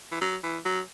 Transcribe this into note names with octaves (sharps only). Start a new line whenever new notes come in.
E3
F#3
E3
F#3